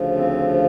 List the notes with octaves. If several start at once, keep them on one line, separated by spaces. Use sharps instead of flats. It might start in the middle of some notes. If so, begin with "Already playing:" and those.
Already playing: D2 C#3 F3
C4